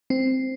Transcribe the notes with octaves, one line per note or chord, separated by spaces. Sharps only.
C4